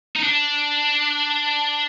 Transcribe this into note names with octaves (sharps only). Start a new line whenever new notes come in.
D#4
D4